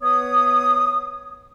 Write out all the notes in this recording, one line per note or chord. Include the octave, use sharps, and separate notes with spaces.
B3 B4 C#5 D#6